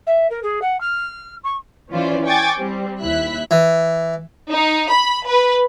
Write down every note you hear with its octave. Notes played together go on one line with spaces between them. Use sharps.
E5
A#4
G#4
F#5
F6
C#6
E3 C#4 F4 C5 D5
G5 G#5 C#6 D6 G#6 A6
G3 C4
D#2 E4 E5 F#6 B6
E3
D#4
B5
B4